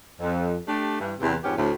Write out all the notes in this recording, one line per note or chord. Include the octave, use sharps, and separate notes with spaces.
F2
A3 D4 G4
G2 E3
E2 C3
F2 G#2 B3 C#4 G4
D2 A2